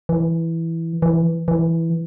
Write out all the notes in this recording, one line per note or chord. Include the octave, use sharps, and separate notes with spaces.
E3
E3
E3